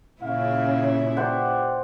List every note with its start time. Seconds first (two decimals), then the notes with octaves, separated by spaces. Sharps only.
0.22 A#2 C#3 E4 F5
1.17 G4 C5 D5 F#5